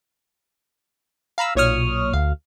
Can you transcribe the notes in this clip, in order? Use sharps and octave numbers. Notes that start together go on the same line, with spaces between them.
F5 A#5 B5 E6
B1 A#2 C#5 C#6 D#6 F6
D2 F5